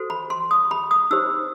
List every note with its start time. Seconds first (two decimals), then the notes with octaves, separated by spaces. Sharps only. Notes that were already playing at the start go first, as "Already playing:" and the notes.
Already playing: F#4 A4 C5
0.10 B5
0.30 C6
0.51 D#6
0.71 B5
0.91 D#6
1.11 D#4 G4 C5 E6